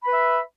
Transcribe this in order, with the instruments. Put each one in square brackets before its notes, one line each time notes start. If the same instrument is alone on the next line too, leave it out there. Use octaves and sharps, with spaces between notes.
[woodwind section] B5
B4
E5